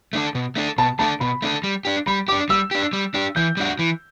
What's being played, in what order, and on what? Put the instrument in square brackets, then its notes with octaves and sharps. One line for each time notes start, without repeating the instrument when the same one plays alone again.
[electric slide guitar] A3 D4 A4
B2
A3 D4 A4
[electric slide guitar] B2 [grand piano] A5
[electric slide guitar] A3 D4 A4 [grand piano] A5
[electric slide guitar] B2 [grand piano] B5
[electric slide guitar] A3 D4 A4
G3
D4 G4
[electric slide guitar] G3 [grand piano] B5
[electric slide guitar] G4 [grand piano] D6
[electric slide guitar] D4
[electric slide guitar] G3 [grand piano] E6
[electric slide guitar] D4 G4
G3
D4 G4
[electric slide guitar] E3 [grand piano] G6
[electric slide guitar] G3 D4 F#4
E3